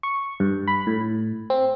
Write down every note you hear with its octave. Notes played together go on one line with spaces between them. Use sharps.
C#6
G2
B5
A2
C4